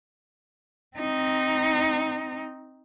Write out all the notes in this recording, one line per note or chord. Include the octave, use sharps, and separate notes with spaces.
C4 D#4